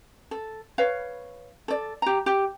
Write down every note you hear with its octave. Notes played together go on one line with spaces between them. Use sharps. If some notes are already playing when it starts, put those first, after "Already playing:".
A4
B4 C#5 F5
A4 D5
G4 A#5
G4